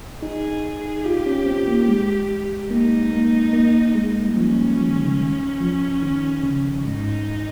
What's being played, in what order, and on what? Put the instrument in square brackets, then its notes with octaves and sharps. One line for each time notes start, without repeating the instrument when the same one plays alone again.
[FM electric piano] D#4 [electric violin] G#4
[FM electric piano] F4 [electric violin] G4
[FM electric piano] C#4
C4
A#3
G#3
[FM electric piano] A#3 [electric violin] D#4
[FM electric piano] A#3
A#3
G#3
G3
[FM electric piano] F3 [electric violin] C#4
[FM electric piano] F3
D#3
C#3
D#3
F3
D#3
C#3
[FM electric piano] G#2 [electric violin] D#4